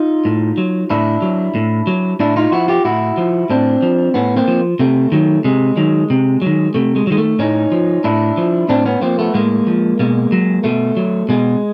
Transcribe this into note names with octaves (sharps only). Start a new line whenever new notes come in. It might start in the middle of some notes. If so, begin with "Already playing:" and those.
Already playing: D#4 F4
A2
F#3
A2 D4 E4
F#3
A2
F#3
A2 D4 E4
D#4 F4
F3 E4 F#4
F4 G4
A2 E4 F#4
F3
A2 C4 D4
F3
A2 B3 C#4
A#3 C4
F3
C3 A3
D#3 F#3
C3 G#3
D#3 F#3
C3
D#3 F#3
C3 A3
G#3
F#3
D#3 G#3
A3
A2 C#4 D#4
F3
A2 D4 E4
F3
A2 C4 D4
B3 C#4
F3 A#3 C4
A3 B3
A2 G#3 A#3
F3
B2 G#3 A#3
F#3
B2 A3
F#3
B2 G#3